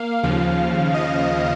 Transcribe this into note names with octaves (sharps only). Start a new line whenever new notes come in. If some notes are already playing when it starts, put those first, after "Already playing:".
Already playing: A#3 F5
D#2 C#3 F3 F5
D#5